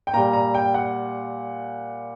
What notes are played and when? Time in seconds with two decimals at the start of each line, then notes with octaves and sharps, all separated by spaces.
0.07 G5
0.14 A#2 G3 A#5
0.33 A#5
0.55 G5
0.74 F#5